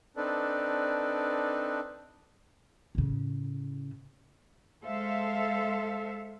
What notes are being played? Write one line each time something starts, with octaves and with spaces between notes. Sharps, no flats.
C4 D4 D#4 A4 B4 D5
A2 C#3
G#3 A4 C5 E5 F5